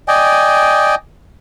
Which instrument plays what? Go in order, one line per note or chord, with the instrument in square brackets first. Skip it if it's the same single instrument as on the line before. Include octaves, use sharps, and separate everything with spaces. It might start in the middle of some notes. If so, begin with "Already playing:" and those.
[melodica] D5 D#5 G5 G#5